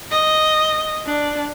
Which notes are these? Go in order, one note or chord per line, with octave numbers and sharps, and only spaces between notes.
D#5
D4